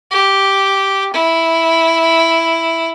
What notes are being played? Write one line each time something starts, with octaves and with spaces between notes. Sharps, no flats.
G4
E4